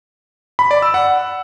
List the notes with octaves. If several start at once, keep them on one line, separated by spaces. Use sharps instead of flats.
B5
D5
E6
F#5